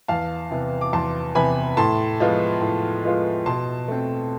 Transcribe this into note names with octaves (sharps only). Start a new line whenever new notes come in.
E2 F5 A5
C3 E3 B3
D6
E2 A5 C6
C3 E3 B3 G#5 B5
A2 A5 C6
F3 G#3 B3 F4
A2
F3 G#3 B3 F4
B2 A5 C6
A3 C4